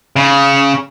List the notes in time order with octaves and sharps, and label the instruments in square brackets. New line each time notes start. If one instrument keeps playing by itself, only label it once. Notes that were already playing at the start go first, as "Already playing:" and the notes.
[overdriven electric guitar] C#3